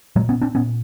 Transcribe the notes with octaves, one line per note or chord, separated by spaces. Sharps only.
A#2 F#3 G#3
B3 C#4
C4 D4
A#2 B3 C#4